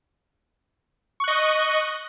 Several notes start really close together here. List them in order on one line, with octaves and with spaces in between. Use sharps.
C#6 F#6 D#5